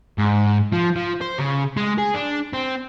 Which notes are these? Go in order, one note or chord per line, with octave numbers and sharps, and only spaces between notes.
G#2
F3
F3
C5
C#3
G#3
G#4
D4
C4